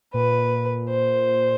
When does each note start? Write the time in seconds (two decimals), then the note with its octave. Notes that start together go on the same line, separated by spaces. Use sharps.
0.14 A#2 B4
0.89 C5